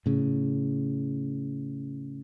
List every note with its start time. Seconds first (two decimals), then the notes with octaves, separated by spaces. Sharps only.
0.06 A2 C#3